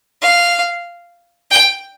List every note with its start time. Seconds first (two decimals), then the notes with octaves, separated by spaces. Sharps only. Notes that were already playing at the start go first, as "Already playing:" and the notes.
0.22 F5
1.51 G5